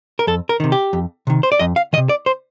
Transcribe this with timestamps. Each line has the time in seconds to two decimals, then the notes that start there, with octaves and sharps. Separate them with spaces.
0.19 A#4
0.27 F2 A4
0.49 A#4
0.60 C3 D#3
0.72 G4
0.93 F2
1.27 C3 D#3
1.43 C5
1.52 D5
1.59 F2 D#5
1.76 F5
1.93 D#3 D#5
1.97 C3
2.09 D5
2.26 C5